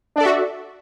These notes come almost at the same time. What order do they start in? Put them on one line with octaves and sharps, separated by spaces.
D4 D5 A4 E5 F#4